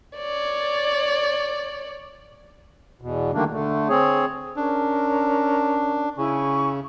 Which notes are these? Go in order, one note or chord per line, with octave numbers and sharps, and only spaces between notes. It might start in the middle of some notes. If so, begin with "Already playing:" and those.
C#5 D5
E2 B2
D3 D#3 G3 A3 A#3 D4
D3 A3
C4 G#4 C#5
C#4 D4 A#4
C#3 E4 G#5 C#6